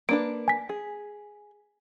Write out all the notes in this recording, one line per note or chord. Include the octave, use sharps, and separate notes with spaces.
A#3 D4 B4 D7
G#5 B6
G#4